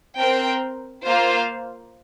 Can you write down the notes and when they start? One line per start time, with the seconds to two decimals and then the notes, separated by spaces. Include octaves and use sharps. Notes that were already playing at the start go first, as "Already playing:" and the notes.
0.18 C4 A#4 G5
1.04 A#3 F4 C5 F5